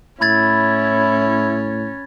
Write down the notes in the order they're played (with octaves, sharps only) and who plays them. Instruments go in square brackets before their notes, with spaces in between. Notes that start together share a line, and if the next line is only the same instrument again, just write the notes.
[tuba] A2 [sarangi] C#4 [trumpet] E4 [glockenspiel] B5 G#6 A6